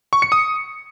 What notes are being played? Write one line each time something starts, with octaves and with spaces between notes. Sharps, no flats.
C#6
C#7
D#6